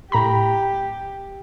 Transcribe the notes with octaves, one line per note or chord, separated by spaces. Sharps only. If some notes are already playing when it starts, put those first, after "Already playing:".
A2 G4 A#5 B5